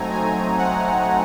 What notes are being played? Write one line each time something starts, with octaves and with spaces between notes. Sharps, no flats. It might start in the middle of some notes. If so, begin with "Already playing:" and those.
Already playing: F#3 A3 C4 D#4 G#5 A#5
G#5
F#5